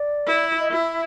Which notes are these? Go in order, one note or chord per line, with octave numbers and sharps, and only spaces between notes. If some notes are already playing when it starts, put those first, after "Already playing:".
Already playing: D5
E4
D#5
E4 E5